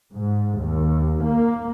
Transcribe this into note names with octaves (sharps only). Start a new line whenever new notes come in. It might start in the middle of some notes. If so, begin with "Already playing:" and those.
G#2
D#2
A#3